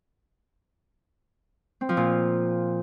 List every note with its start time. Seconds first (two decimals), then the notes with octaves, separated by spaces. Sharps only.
1.81 C4
1.89 F3
1.97 A#2